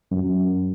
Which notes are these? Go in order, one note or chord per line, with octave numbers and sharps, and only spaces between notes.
F#2